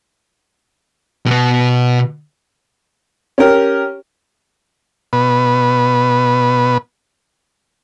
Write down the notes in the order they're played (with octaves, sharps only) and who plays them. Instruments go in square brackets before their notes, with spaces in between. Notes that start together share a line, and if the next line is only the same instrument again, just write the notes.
[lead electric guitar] B2 B3
[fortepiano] C#4 G4 A#4
[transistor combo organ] B2 B4